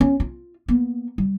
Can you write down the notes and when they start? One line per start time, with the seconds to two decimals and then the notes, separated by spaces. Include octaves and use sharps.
0.01 C#4
0.20 F4
0.68 A#3 B3
1.18 G3